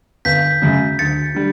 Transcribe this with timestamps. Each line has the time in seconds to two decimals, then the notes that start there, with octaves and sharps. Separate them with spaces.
0.25 G1 G6 B6
0.62 F#2 C#3
0.99 D2 A6 C#7
1.35 D3 G3